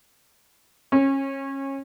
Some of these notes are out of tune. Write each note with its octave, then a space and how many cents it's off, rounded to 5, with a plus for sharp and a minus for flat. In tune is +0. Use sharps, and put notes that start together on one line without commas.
C#4 -25